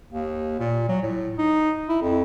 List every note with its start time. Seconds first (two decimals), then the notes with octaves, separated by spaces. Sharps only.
0.11 D#2
0.59 A#2
0.89 F#3
1.02 A2
1.38 D#4
1.89 E4
2.02 F2